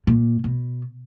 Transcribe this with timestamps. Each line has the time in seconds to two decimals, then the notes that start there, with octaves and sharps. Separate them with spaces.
0.07 A#2
0.44 B2